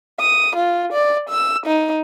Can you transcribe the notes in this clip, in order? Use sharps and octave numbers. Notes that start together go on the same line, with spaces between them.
D#6
F4
D5
E6
D#4